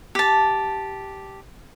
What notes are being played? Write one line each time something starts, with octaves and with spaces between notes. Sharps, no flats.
G4 A5